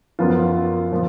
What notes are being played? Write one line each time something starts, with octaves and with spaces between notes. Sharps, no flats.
F#2 F3 B3 F4
A#2 F3